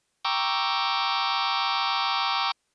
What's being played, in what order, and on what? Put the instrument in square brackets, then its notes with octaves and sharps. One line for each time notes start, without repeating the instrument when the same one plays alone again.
[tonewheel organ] G5 A#5 C#6 D6 E6